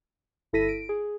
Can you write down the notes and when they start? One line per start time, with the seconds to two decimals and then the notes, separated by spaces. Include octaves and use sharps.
0.53 G1 E4 A4 A#6 B6 D#7
0.69 D7
0.89 G#4